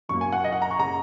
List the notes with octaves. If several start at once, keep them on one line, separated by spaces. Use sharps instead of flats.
F#1 F#2 F#3 A#3 C#6
G#5
F#5
D#5
F#5
A#5
C#6
C#3 A#5